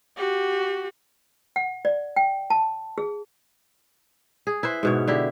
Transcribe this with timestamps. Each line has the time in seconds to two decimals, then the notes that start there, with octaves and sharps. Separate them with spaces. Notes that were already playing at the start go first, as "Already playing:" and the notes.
0.17 F#4 G4
1.56 F#5
1.85 D5
2.16 G5
2.50 A5
2.98 G#4
4.47 G#4
4.63 E4 B4 C5
4.83 G#2 B2 C#5
5.08 D3 E4 G4